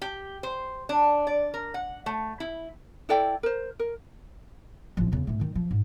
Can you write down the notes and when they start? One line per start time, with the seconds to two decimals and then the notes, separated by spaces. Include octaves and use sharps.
0.02 G4
0.43 C5
0.89 D4
1.27 D5
1.54 A#4
1.74 F#5
2.06 A3
2.40 E4
3.09 E4 A4 D5 G5
3.43 A#4 C5
3.79 A#4
4.97 A1 F3
5.12 E2 C#3
5.27 G#2 A3
5.40 D#3 D#4
5.55 F3
5.71 G#2